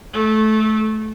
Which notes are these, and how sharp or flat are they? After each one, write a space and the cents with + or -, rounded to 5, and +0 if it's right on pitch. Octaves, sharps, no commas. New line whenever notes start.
A3 -20